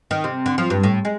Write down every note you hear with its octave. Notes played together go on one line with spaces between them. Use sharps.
D#3
C3
D3
F3
G2
A2
G#3